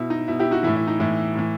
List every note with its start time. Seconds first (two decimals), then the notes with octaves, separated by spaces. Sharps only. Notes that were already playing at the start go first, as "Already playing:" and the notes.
Already playing: B2 E4
0.10 D#4
0.28 B2 E4
0.39 E4 G4
0.51 D#4 F#4
0.63 E3 E4
0.67 A2
0.76 E4
0.87 D#4
1.00 A2 E3 E4
1.35 A2 E3